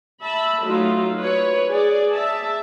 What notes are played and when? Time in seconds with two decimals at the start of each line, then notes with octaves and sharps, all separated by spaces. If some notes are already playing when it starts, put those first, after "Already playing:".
0.23 E5 A5 B5
0.63 F#3 A3 D#4 F4
1.18 B4 C#5
1.69 G#4 D5
2.13 E5 A5